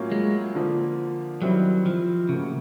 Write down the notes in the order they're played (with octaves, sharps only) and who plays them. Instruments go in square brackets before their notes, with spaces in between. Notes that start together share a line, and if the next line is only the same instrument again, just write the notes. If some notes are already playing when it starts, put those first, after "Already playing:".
Already playing: [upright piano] A2 F#3 A#3 C#4 F4
[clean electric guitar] G#3
[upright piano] D3 F3 A#3
[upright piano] D#3 G3 C4 E4 [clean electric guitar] F#3
[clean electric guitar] F3
[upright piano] A2 F#3 A#3 [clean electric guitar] C#3